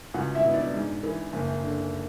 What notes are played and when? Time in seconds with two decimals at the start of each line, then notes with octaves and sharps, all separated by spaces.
0.14 C#2 F#4 F#5
0.35 E4 E5
0.43 B2
0.54 D4 D5
0.74 G#2
1.03 E3
1.33 F#1
1.63 D3